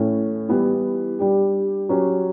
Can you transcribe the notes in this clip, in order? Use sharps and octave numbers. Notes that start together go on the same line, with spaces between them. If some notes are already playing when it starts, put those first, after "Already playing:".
Already playing: A2 E3 A3 C#4
E3 G3 B3 E4
G3 D4 G4
F#3 C#4 G4